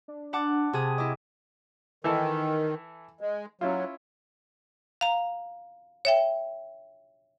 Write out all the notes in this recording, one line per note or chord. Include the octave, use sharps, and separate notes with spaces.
D4
F#5 A5 D6
C3 G#4 A5 D#6
E4 D#5 D6
D#3 E3 E4 A4
G#3
F#3 C#4 E4 F4
F5 A#5
C#5 E5 G5